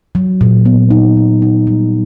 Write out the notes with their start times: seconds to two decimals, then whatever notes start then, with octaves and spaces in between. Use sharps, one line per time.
0.15 F#3
0.41 A#2
0.65 B3
0.91 D#4
1.17 F#3
1.42 D#4
1.67 G3